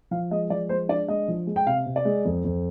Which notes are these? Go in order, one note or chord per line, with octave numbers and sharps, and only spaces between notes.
F3 F5
G#3 D#5
F3 D5
G#3 C5
D4 D5
G#3 D#5
F3
G#3
G5
C3 F5
C3
D5
G#3
F2
F2